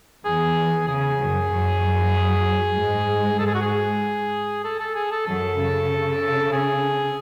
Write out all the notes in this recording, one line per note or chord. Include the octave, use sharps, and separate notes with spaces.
E2 E3 G#4
C#3 G#4
F#2 F#3
F#2 F#3
G#2 G#3
G#2 G#3 A4
G#4
F#4
G#4
A4
A4
G#4
A4
F#2 F#3 A4
C#3
G#4